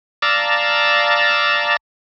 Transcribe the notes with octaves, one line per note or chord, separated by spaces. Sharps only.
D5 F5 A5 A#5 E6